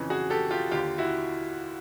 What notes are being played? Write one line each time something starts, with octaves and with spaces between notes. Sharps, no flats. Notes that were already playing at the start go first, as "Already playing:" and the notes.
Already playing: F2 C#3 E3
F#4 G#4
G4 A4
F4 G4
D#2 D3 F4 G4
E4 F#4